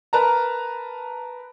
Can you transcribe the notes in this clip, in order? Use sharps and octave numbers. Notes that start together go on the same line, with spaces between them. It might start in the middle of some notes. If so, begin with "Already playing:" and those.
A#4 B4 A5 A#5